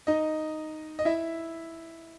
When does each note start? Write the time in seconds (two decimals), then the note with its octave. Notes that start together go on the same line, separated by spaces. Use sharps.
0.07 D#4 D#5
0.99 D#5
1.05 E4 E5